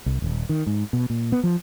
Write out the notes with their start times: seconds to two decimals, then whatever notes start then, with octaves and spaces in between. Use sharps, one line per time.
0.06 C2
0.22 D#1
0.49 D#3
0.67 G#2
0.93 B2
1.10 A#2
1.32 B3
1.43 F3